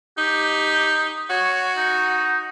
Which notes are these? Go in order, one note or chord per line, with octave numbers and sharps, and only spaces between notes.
D#4 G4
F#4 C#5
D#4